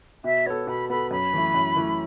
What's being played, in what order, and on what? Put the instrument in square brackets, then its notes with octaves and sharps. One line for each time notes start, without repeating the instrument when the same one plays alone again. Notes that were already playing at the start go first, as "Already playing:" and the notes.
[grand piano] B2 [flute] E5
[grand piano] B3 A4 [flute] C#5
[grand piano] B2 [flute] B5
[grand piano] B3 A4 [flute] B5
[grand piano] F#2 [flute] B5
[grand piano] E3 A3 E4
F#2
E3 A3 E4